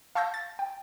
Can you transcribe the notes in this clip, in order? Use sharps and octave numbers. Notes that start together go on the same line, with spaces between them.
F5 A5 C#6 E6 G6 A#6
A6
G5